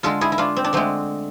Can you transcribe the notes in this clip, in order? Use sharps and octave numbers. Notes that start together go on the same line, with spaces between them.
D3 G#3 F4 A4
E4 G#4
E4
D4 F4
C4
D4
D3 G#3 A3 C4